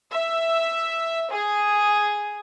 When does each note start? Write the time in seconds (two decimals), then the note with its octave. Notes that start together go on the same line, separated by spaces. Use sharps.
0.11 E5
1.32 G#4